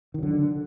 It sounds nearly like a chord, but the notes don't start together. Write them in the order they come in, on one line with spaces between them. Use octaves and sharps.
D#3 F#3 D3